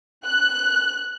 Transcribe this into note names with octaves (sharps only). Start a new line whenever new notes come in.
F#6